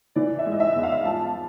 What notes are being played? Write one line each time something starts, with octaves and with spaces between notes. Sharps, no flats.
E3 D5
E5
G#3
D#5
E5
E2
F5
F3 A5